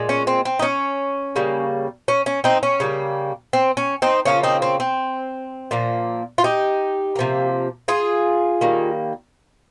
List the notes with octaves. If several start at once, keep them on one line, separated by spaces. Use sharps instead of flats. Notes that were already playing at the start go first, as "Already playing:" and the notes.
Already playing: A#2 G#3
C#4
C4
C4
D#4
C#4
C#3 G3 A#3
C#4
C#4
C4 D#4
C#4
C#3 G3 A#3
C4
C#4
C4 D#4
C#3 F3 A#3 C#4 F4
C4 D#4
C4
C4
A#2 F3 A#3
F4
D#4 G4
C3 F3 A#3
F4 G#4
D#3 G3 A#3